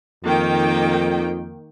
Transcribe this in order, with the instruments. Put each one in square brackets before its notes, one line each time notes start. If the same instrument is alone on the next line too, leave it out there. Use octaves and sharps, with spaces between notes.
[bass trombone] F2 [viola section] D#3 A#3 G5